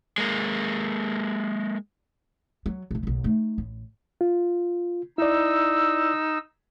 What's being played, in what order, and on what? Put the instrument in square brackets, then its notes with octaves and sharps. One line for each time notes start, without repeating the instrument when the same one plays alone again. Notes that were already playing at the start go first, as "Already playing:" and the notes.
[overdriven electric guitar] G#3 A#3
[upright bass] F#3
F1 A#1
F#1 B1
A3 D#4
A1
[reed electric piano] F4
[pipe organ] D#4 E6 [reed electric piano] E4 D5